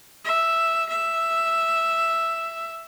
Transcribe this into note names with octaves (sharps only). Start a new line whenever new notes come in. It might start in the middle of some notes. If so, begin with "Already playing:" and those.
E5
E5